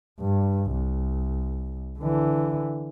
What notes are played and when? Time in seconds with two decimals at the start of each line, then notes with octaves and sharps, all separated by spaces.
0.19 G2
0.72 C2
1.99 D3 E3